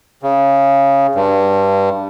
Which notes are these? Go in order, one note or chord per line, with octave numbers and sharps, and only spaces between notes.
C#3
G2